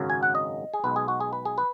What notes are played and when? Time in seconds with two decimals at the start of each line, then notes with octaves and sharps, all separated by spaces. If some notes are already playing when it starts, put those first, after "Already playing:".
Already playing: G#1 F#2 C#3 F#3
0.10 G#5
0.23 F#5
0.35 D#5
0.74 G#4
0.84 B1 B2 G#3 B4
0.96 G#4
1.08 F#4
1.20 G#4
1.33 B4
1.45 G#4
1.58 B4